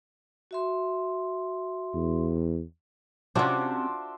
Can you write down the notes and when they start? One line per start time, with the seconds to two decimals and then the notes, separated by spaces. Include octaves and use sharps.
0.51 F#4 E5 C6
1.94 E2
3.35 C3 C#4 D4 F4 F#4 C5 E5 D6